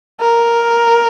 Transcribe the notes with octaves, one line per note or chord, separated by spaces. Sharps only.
A#4